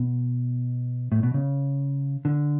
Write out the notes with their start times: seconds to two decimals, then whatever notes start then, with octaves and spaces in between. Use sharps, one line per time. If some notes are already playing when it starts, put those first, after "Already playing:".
Already playing: B2
1.12 A2
1.23 B2
1.34 C#3
2.25 D3